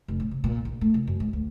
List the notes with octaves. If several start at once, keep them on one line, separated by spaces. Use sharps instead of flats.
F1
A2
C3
A#2
A#1
A3
C2
F#2
G#2
D2